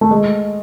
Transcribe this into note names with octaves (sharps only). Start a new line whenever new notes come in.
A3
G#3